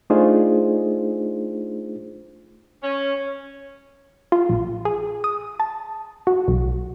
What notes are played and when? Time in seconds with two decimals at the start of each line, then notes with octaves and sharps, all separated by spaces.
0.10 A3 D4 D#4 F4 G#4 C5
2.82 C#4
4.32 F4
4.49 A#1
4.85 G#4
5.24 D#6
5.60 A5
6.27 F#4
6.48 B1